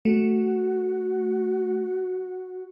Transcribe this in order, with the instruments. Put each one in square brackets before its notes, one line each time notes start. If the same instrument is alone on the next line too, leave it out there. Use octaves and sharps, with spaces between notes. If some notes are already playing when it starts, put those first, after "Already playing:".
[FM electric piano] A3 [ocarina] F#4